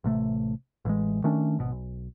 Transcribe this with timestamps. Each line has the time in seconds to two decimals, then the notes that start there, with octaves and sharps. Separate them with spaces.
0.04 A1 C3 A3
0.85 A1 E3 G#3
1.24 D#3 A3 C#4 D4
1.59 G#1 B2
1.72 B1